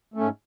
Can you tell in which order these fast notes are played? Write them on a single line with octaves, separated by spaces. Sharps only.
A3 C#4 G#2